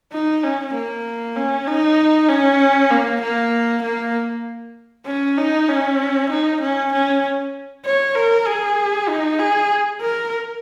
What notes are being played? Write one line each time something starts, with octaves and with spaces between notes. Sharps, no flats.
D#4
C#4
A#3
C#4
D#4
C#4
A#3
A#3
A#3
C#4
D#4
C#4
D#4
C#4
C#4
C#5
A#4
G#4
D#4
G#4
A#4